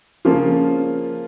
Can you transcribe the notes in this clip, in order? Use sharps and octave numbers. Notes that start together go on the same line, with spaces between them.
C#3 F3 A#3 C#4 F4